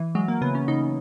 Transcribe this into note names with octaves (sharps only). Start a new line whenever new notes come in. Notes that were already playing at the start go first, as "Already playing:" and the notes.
Already playing: E3
F#3 G#3
A#3
C#3 B3
C#4
C#3 D#4